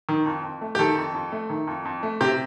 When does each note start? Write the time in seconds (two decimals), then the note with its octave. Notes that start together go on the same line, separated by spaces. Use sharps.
0.09 D#3
0.26 F2
0.44 F2
0.61 A3
0.75 G4
0.79 D#3 A4
0.97 F2
1.14 F2
1.32 A3
1.50 D#3
1.67 F2
1.85 F2
2.03 A3
2.21 C3 G4